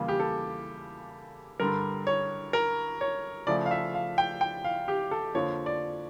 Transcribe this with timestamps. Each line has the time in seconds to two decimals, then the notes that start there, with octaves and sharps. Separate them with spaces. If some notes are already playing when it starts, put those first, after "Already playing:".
Already playing: E2 C#3 G3 A#3 F4
0.08 G4
0.20 A4
1.60 G2 D3 G3 A#4
2.07 C#5
2.53 A#4
3.01 C#5
3.47 C#3 F3 A3 D5
3.66 F5
3.71 E5
3.94 F5
4.18 G5
4.41 G5
4.64 F5
4.88 G4
5.11 A4
5.34 F2 D3 F3 A#3 C#5
5.66 D5